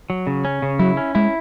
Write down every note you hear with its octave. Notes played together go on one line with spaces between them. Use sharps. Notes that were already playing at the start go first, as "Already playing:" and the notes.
F#3
C#3
C#4
C#3
F#3 E4
C#4
G#3 E4